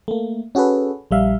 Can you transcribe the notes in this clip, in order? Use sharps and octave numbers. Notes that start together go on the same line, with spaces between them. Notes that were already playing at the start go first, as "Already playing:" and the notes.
A3 A#3
C#4 F#4 G#4 A4 B4
A#1 G3 E5 F5